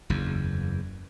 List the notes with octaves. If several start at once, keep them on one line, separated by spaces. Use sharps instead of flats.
F#1 E2